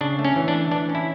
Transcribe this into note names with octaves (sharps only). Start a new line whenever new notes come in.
C#3 D4
A3
C#4
E3
D4
A3
E3 D4
C#4
E4